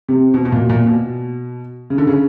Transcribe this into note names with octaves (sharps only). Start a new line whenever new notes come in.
C3
B2
B2
A#2
A#2
B2
C#3
D3
C#3